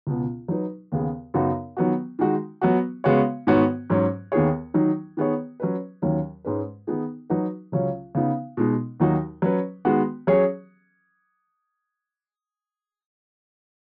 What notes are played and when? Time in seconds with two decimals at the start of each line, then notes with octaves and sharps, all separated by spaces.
0.07 C#2 B2 B3
0.48 F#3 D#4 B4
0.92 D#2 C#3 B3 G#4
1.34 F#2 C#3 B3 D#4 F#4
1.77 D#3 F#3 B3 F#4
2.19 D#3 G#3 D#4 F#4
2.61 F#3 B3 F#4
3.04 C#3 G#3 B3 F#4 C#5
3.47 G#2 D#3 B3 F#4 C#5
3.90 G#2 F#3 C#4
4.32 D#2 D#3 B3 G#4 C#5
4.74 D#3 F#3 D#4
5.17 D#3 B3 G#4 C#5
5.60 F#3 C#4 B4
6.02 D#2 D#3 F#3 C#4
6.45 G#2 G#3 C#4 B4
6.87 D#3 B3 D#4 G#4
7.30 F#3 D#4 F#4 B4
7.72 C#2 C#3 F#3 C#4
8.15 C#3 B3 D#4
8.57 B2 G#3 D#4
9.00 D#2 D#3 F#3 D#4 F#4
9.42 F#3 C#4 B4
9.85 D#3 G#3 B3 F#4
10.27 F#3 C#4 G#4 C#5